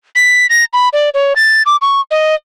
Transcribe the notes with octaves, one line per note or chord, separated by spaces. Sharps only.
B6
A#6
B5
D5
C#5
A6
D6
C#6
D#5